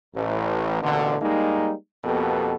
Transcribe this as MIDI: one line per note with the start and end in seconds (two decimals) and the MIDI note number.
0.14 0.79 33
0.81 1.16 33
0.81 1.16 39
0.81 1.16 47
0.81 1.16 50
1.21 1.73 55
1.21 1.73 56
1.21 1.73 58
1.21 1.73 63
2.04 2.55 41
2.04 2.55 47
2.04 2.55 58
2.04 2.55 59
2.04 2.55 67
2.04 2.55 69